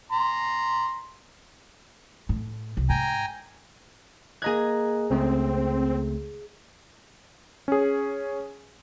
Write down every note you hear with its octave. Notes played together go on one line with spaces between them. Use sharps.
A#5 C6
A2
C2
G#2 G5 G#5 A#5
A#3 G#4 D#5 A#5 F#6 G#6
C#2 C#3 A3 C4
C#4 G#4